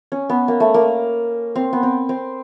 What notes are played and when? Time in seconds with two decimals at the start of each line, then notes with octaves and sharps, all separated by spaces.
0.12 C#4
0.29 B3
0.48 A#3
0.60 A3
0.74 A#3
1.55 C4
1.73 B3
1.83 C4
2.09 C4